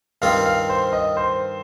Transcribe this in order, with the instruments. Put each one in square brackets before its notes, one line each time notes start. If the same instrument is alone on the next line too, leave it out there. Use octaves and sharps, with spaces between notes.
[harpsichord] G2 D#3 C4 F4 [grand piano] F5
[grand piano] F5
C5
D#5
C5